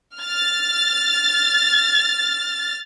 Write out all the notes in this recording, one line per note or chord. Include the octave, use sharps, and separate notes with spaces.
F6 A6